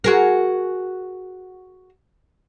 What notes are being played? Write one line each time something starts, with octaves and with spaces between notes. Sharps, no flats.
F#4 G#4 A#4